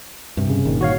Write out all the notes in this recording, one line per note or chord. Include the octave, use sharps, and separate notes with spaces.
G2 C3
C#3
G1 A#2 D#3
F#4 C#5 F5